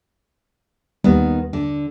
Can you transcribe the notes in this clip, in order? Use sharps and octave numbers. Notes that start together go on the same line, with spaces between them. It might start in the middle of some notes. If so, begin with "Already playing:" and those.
D#2 D#3 G3 B3
D3